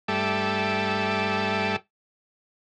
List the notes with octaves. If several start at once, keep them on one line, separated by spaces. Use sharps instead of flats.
G2 G3 A3 A4 E5 D6